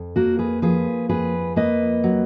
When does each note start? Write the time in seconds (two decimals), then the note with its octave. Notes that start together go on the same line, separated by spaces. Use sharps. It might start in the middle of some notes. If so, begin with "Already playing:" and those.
Already playing: F2
0.16 A#3 F#4 A#4
0.39 G#4 B4
0.62 F3 G#4 B4
1.09 F2 G#4 B4
1.56 A#3 B4 D#5
2.04 F#3